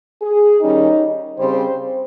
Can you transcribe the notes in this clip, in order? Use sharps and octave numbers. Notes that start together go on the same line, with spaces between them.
G#4
D#3 G3 C#4 D#4
C#3 G3 C4 C5